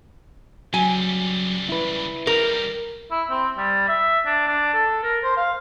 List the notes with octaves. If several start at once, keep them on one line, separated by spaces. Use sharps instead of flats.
C#3 F#3 G3 G#5
E4 B4
D#3 G3 A#4
E4
C4
G3
E5
D4
D4
A4
A#4
C5
F5